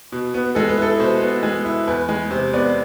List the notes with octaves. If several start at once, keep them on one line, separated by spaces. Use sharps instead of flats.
B2
B3
G#3 A4
B4
E4 A4
B2 C5
B3
G#3
E4
E2 B4
G#3
C3 C5
B3 D5